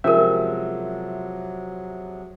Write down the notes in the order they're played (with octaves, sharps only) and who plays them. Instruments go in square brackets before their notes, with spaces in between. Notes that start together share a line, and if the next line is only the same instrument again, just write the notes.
[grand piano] C3 F3 G#3 [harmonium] F#3 [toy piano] C#4 A#4 [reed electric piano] E5